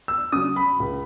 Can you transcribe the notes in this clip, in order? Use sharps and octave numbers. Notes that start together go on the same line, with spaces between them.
E6
C#3 F#3 D#6
B5
C#2